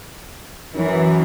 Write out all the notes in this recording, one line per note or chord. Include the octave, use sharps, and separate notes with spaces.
F#2 E3